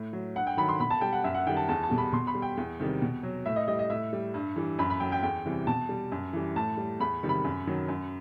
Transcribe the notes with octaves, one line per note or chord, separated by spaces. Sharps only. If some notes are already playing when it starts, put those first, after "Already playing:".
Already playing: A2
F#3
G2 F#5
G5
D#3 F#3 B5
C6
B2 B5
A5
G3 G5
F#5
F#2 E5
F#5
D#3 G3 G5
A5
E2 A5
A5
B2 G3
B5
B2 C6
B5
G3
G5
E2
C3 D#3 G3
B2
F#3
A2 E5
D#5
G3 D#5
D#5
A2 E5
G3
G2
E3 G3
F#2 B5
B5
F#3 G5
G5
E2 G5
C3 E3 G3
B2 A5
G3
F#2
E3 G3
A2 A5
G3
E2 B5
C3 D#3 G3
B5
F#2
D#3 F#3
F#2